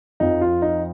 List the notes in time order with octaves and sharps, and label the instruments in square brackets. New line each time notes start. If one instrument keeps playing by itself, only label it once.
[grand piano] F2 F3 D#4
F4
D#4